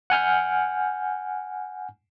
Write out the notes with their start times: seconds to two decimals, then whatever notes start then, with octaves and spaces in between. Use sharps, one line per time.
0.10 F#5 G#5 F6 G6